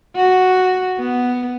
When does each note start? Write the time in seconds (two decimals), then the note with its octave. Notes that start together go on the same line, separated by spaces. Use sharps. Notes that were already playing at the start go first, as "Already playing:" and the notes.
0.16 F#4
0.99 B3